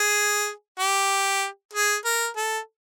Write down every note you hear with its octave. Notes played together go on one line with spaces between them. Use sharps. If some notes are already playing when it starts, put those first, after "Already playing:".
Already playing: G#4
G4
G#4
A#4
A4